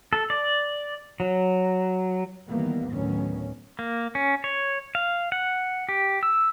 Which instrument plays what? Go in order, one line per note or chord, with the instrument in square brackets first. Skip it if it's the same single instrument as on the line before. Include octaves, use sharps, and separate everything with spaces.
[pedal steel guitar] A4
D5
F#3
[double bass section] D#3 E3 G3 A#3 B3
D2 A2 D#3 F#3 B3 C#4
[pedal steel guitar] A#3
C#4
C#5
F5
F#5
G4
E6